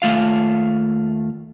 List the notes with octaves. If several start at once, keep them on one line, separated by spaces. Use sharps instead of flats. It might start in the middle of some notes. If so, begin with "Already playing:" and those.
D#2 A3 F4 F5